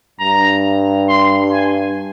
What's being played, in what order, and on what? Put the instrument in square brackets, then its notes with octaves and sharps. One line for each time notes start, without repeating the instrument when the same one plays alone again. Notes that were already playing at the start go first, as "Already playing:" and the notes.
[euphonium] G2 [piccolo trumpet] A#5
[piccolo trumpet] C6
G#5